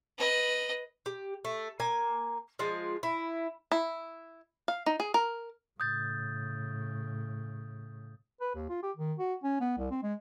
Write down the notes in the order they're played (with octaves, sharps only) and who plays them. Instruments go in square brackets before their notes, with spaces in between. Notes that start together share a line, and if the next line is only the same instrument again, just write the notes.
[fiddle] B4 D#5
[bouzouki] G4
A3
A#3 G#5
F3 G#3 F4
E4
[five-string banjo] E4
F5
D#4
G#4
A#4
[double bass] A2 C#3 [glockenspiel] D#6 G6 A6
[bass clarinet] B4
D#2
F4
G4
D#3
F#4
C#4
B3
C2
C4
G#3